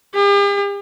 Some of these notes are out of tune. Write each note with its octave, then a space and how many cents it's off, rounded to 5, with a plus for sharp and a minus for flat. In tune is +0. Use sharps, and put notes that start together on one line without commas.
G4 +45